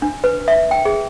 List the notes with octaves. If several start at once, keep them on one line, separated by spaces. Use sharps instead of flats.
D4
B4
E5
G5
G#4